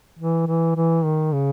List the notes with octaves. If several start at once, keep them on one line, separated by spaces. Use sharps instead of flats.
E3
E3
E3
D#3
C#3